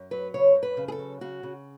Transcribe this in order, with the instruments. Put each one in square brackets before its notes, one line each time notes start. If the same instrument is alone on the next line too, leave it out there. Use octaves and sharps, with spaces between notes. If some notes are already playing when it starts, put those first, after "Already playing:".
Already playing: [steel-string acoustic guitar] F#2
F#3 B4
C#3 C#5
F#2
B4
C#3
G#4
A4
F#3
C#3 F#4
C#3